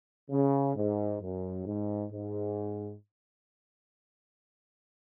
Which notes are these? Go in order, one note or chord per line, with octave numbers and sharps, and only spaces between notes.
C#3
G#2
F#2
G#2
G#2